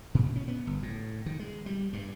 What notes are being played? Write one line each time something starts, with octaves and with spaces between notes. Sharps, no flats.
A#2
C#4
B3
G1
A2
D#3
G#3
G3
G2